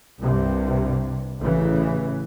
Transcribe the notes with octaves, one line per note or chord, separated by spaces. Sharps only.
C2 G2 C3
A1 C#3 E3